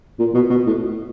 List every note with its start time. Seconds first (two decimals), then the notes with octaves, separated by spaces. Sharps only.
0.19 A#2
0.34 B2
0.50 B2
0.66 A2